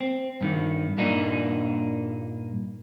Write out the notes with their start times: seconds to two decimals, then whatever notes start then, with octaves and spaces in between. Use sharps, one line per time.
0.01 C4
0.41 G2 D#3
0.98 G2 A#2 A#3 D4 D#4